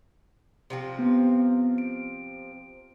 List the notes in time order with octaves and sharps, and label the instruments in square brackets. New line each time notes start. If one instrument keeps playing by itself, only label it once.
[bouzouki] C3 F3 C4
[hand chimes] B3
D7